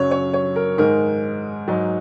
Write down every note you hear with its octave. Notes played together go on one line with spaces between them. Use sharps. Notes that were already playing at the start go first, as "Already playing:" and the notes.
Already playing: F#2 C#3 F#3 C#5
C#5
C#5
A#4
G#2 D#3 G#3 D#4 A#4
G#2 F#3 D#4